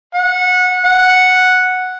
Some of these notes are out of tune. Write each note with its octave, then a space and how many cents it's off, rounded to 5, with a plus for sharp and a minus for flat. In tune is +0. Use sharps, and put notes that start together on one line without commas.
F#5 -20
F#5 -5